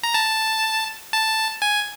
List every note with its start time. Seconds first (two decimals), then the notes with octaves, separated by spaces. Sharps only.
0.04 A#5
0.14 A5
1.12 A5
1.62 G#5